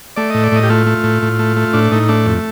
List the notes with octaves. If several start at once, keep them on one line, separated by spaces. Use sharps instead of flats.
A3 D5
A2 D#5
D5
A2 D#5
G4
A3 F4
A3
A2
A2
A3
A3
A2 D4
A2 D#4
A3 D4
F2